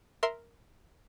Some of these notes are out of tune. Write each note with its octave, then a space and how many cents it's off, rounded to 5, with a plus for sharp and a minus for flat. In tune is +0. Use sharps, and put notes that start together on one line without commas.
A#4 +0 E5 +0 C6 +0